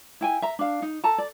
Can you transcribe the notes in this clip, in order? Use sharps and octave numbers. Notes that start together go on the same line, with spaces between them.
E4 G5 G#5
E5 A#5
D4 F5
D#4
A4 A5 A#5
D5